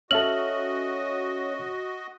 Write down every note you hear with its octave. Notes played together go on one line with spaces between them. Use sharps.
C#4 F#4 A4 D#5 E5 F6 F#7